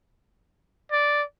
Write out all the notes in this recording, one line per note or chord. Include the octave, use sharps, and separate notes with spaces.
D5